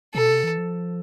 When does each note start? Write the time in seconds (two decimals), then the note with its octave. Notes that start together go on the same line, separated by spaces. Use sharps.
0.15 B2 A4
0.30 C3
0.44 E3
0.58 F3